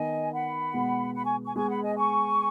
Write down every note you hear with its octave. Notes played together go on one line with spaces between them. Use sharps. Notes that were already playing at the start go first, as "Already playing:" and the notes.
Already playing: D#3 B3 D#4 D#5 G#5
F#5 B5
B2 G#3 B3
F#5 B5
G#5 C#6
G#5 C#6
G#3 B3 G#4 G#5 C#6
F#5 B5
D#5 G#5
G#5 C#6